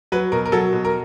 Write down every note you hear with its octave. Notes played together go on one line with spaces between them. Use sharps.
F#3 B4
B2 A#4
A#4
F#3 A4
B2
A#4